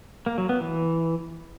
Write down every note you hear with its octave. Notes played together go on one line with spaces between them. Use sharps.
A#3
F#3
B3
E3